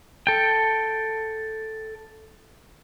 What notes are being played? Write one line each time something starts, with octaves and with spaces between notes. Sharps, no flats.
A4 G5